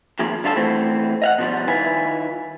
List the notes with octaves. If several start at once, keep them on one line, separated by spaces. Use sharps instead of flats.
F2 D#3 F3 A#3 G#4 A#4
D3 G3 F4 G#4 A4
E3 A3 B3 C4
D#5 F5 F#5
B2 F3 G3
D#3 E4 F4 B4 G#5